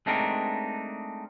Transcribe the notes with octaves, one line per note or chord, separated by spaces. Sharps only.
G#3 A3 C4 D4 D#4 A#4